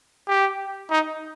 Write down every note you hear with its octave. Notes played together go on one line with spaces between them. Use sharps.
G4
D#4